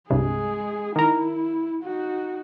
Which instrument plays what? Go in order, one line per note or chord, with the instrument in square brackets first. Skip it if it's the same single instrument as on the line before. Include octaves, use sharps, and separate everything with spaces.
[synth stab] C2 G2 C3 [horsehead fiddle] G#3 G#4
[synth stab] D#3 A#4 [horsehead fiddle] E4
[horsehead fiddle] D#4 F#4